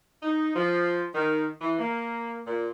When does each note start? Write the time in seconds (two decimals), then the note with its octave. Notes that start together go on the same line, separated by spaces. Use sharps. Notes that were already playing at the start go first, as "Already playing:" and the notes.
0.23 D#4
0.56 F3
1.14 D#3
1.61 E3
1.79 A#3
2.46 A#2